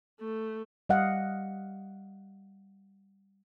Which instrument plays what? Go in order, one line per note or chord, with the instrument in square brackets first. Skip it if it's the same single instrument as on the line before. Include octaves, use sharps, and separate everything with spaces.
[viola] A3
[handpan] G3 D#5 F5 F#5